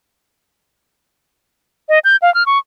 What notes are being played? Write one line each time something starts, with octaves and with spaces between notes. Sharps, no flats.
D#5
G6
F5
F6
C#6